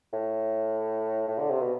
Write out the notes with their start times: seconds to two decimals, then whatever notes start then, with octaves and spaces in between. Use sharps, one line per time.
0.13 A2
1.28 A2
1.39 D3
1.51 C3
1.62 B2